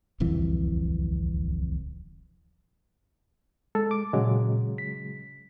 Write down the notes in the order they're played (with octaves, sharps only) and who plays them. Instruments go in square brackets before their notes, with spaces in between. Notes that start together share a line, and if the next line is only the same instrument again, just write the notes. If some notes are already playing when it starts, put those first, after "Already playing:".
[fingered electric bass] D1 C2 F2 E3
[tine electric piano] G#3 [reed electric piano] A4
[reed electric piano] D6
[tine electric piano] A#2 [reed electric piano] C#3 F#3 G#3
[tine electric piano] B6